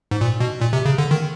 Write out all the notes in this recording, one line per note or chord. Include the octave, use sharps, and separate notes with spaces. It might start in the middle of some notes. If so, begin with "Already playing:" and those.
G#2
A#2
B2
A#2
C3
C#3
D3
D#3